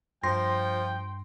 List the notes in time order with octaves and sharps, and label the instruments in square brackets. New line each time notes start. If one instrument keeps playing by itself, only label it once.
[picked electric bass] G2 [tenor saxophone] F3 [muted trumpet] G5 [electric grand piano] C6 A#6